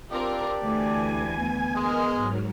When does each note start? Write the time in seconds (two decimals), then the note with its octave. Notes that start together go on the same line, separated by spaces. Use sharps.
0.11 C4 D4 F4 G4 A#4 D5
0.62 D2 E3 A3 G#5
1.37 B3
1.75 G#3 A#4 F6
2.13 G#2 F#3